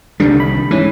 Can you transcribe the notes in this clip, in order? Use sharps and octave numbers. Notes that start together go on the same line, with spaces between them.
C2 D3 D#3 G3
B5
G#2 E3 C#4